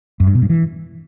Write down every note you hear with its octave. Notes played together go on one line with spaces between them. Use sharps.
F#2
G2
B2
G2
E3